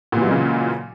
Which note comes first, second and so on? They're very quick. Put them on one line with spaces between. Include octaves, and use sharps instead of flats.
A#2 E3 F#3 G#3 C#3